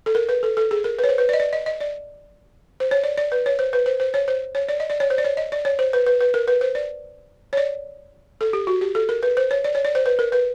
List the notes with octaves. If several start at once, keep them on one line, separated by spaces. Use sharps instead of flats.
A4
A#4
B4
A4
A4
G#4
A#4
B4
C#5
C5
B4
D5
D#5
D5
D#5
D#5
D5
C5
C#5
D5
D5
B4
C#5
C5
B4
C5
C5
C#5
C5
C#5
D5
D#5
D5
C#5
C5
D5
C#5
D#5
D5
C#5
C5
B4
B4
B4
A#4
B4
C5
D5
C#5
D5
A4
G4
F#4
G4
A4
A#4
B4
C5
C#5
D5
C#5
D5
C5
B4
A#4
B4